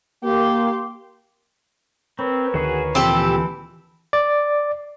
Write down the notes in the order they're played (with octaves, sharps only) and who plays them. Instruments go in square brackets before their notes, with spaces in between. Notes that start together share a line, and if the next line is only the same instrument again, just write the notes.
[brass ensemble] A#3 [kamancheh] G4 C6
[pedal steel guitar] C4 [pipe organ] A#4 B4 C#5
[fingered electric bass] D2 D#3 [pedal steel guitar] F#4 G#4
[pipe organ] A#2 F3 [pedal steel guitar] E3 [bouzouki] C4 G4 A4
[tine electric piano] D5